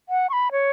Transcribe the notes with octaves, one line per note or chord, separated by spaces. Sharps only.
F#5
C#6
B5
C#5